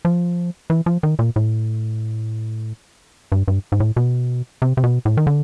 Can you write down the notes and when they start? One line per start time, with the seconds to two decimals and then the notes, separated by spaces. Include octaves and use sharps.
0.05 F3
0.70 E3
0.86 F3
1.03 D#3
1.19 A#2
1.36 A2
3.32 G2
3.48 G2
3.72 G#2
3.80 A2
3.97 B2
4.62 C3
4.77 C3
4.84 B2
5.05 A2
5.17 D#3
5.27 D3